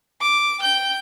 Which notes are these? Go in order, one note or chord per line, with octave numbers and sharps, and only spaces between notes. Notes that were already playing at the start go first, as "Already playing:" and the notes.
D6
G5 G6